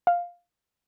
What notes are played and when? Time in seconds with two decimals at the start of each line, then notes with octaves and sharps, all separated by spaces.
0.07 F5